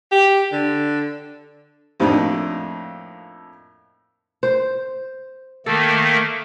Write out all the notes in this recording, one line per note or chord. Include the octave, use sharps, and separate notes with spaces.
G4
D3
F2 A2 A#3 D4 D#4
C5
D#3 A3 A#3 A4